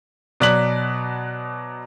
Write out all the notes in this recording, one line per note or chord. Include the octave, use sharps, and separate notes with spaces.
B2 F#3 D5 F#6 B6 F#7